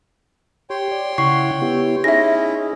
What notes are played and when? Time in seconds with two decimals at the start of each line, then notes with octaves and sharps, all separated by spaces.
0.70 G4 C#5 G5 C6
0.92 D5
1.18 C#3 E4 F#5 C#6 C7
1.62 B3 E4 G4
2.04 C#4 D#4 E4 G#4 E5 A#6